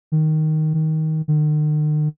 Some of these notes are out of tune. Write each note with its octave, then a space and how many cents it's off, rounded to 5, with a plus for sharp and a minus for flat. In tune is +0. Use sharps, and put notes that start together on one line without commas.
D#3 +0
D#3 +15
D#3 -45